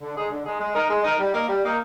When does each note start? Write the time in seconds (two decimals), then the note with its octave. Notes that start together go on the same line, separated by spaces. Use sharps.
0.02 D3
0.16 G#3 D#4 G#4
0.31 D3
0.45 G#3 D#4 G#4
0.60 G#3
0.75 D#4 A#4
0.89 G#3
1.04 D#4 A#4
1.19 G3
1.33 A#3 D#4 A#4
1.48 G3
1.63 A#3 D#4 A#4